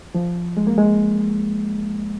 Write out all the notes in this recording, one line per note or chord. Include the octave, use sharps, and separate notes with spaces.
F3
G#3
A#3
G#3